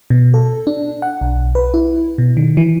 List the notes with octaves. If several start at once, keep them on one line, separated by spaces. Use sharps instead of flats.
B2
A4
D4
F#5
B1
B4
E4
B2
D#3
E3